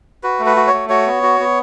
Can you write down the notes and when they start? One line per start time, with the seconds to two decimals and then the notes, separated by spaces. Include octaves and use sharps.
0.23 F#4 B4
0.39 A3
0.46 B4
0.57 F#4
0.67 C#5
0.73 A3
0.89 F#4 C#5
1.06 B3
1.23 F#4
1.40 B3